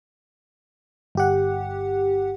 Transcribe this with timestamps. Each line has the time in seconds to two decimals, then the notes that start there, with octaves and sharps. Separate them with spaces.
1.15 G1 G4 F#5